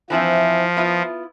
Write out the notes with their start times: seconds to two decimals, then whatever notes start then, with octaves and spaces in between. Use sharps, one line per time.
0.10 E3 F3 C4 E4
0.77 B3 E4 F4